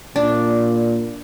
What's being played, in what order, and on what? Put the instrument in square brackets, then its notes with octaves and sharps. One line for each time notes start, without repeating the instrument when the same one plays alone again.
[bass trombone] A#2 [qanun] D4